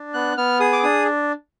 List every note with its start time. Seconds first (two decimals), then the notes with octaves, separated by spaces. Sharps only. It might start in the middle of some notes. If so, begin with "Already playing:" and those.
Already playing: D4
0.14 B3 F#6
0.37 B3 F6
0.60 G#4 D#6
0.73 D6
0.83 D4 D#6